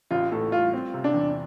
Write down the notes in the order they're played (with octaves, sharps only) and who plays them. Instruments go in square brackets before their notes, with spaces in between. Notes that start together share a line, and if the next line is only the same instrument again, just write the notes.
[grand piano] A1 [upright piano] F4
[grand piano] A2 [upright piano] A4
[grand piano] G3 [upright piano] F4
[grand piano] C4
C3
[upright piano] D4
[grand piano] E2